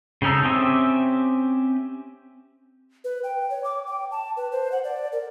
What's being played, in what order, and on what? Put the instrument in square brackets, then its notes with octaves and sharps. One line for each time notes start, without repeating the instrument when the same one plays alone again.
[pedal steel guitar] C#3 C4 C#4 D#4 A4
C4 C#4 G4 E5 D#6
[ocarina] B4
G5
C#5
D6
G5
A5
B4
C5
F#5
D5
A#4